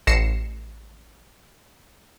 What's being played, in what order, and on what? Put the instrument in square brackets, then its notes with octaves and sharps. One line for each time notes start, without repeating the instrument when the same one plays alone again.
[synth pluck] A1 A#6 C7 C#7 E7